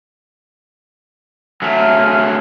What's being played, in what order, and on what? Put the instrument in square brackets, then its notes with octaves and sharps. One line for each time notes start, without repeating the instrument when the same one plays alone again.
[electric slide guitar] F#3 A3 [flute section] E5 G#5 F6